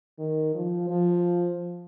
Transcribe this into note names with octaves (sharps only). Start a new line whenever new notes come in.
D#3
F3
F3